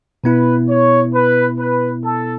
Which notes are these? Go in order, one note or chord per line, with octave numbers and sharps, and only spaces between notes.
B2 B3 E4 B4
C#5
B4
B4
A4